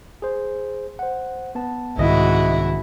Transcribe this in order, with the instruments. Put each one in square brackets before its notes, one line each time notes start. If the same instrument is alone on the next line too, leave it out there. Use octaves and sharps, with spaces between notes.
[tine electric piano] G#4 C5
C5 F#5
B3 A5
[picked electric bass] C2 D#3 [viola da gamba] G#2 E4 F#4 [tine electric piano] C4 D#5 E5